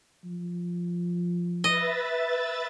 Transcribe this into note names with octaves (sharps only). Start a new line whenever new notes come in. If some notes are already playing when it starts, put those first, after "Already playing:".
F3
B4 D#5 E5 A6